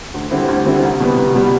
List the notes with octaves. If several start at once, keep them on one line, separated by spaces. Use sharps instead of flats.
D2
D3 G3 C4 E4
D2
D3 G3 C4 E4
C2
B2 G3 B3
C2
B2 G3 B3